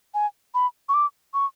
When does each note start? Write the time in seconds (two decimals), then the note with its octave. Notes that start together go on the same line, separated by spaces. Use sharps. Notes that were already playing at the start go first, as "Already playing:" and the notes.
0.14 G#5
0.55 B5
0.89 C#6
0.94 D6
1.34 C#6